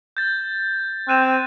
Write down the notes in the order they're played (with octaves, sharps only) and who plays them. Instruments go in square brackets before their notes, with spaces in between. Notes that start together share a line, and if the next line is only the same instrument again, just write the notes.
[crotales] G6 A6
[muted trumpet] C4 [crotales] F#6 D#7 E7